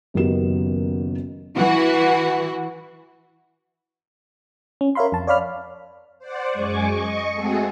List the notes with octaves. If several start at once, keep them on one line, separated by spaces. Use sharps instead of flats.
F#1 F#2 D#3 B3 G4 E7
E3 F#4
C#4
A#4 C#5 E5 F5 B5 C6
F2 A5
C#5 D5 F5 B5 F6
C5 D5 F#5
F#2 G#3 G#5 C#6 D6
D#5 C#6
G#3 A3 C4 F#4 G#4 A4